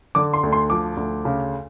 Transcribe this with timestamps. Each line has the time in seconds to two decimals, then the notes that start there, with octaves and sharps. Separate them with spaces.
0.15 D3 D6
0.33 C6
0.43 D2
0.53 C6
0.70 F3 D6
0.97 D2
1.25 C#3